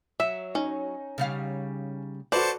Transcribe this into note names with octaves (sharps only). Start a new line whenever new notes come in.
F#3 E5
C#4 D#4
C#3 G3 F5
F#4 A4 B4 C5 D5 A5 C#7